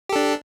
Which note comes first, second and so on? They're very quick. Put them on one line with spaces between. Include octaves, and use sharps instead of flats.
G4 A4 D4